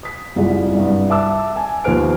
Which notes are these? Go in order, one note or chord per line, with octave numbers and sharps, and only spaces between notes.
D#6 B6
F#1 C2 G3 F4 G#4 F#5
C2 G2
E5 A5 D6 E6
G#5 A5
D#2 F3 B3 C5 F6 D7